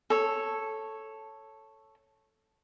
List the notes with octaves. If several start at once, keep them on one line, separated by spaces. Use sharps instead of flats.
A4 C#5